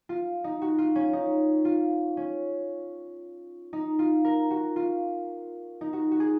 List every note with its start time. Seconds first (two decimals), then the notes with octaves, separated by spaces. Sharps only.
0.09 F4
0.44 D#4
0.62 F#4
0.78 F4
0.96 C#4
1.13 D#4
1.65 F4
2.17 C#4
3.73 D#4
3.99 F4
4.25 A#4
4.51 F#4
4.76 F4
5.81 D#4
5.93 F#4
6.11 F#4
6.20 G#4